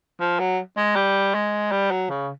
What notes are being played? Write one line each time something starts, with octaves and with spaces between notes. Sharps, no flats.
F3
F#3
G#3
G3
G#3
G3
F#3
C#3